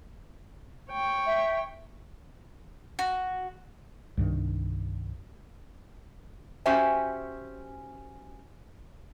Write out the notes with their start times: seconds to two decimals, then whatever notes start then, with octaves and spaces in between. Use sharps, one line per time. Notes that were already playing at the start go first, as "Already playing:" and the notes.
0.91 C#5 G5
1.26 E5
2.99 F#4
4.17 C2 G2 D#3
6.66 C#4 F#4 G4 C5 E5 G#5